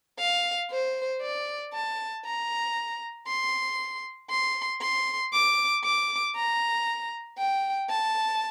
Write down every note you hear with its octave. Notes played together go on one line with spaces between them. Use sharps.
F5
C5
D5
A5
A#5
C6
C6
C6
D6
D6
A#5
G5
A5